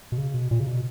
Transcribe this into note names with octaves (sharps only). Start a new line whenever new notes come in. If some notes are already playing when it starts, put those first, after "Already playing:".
B2
C#3
B2
A#2
C#3
B2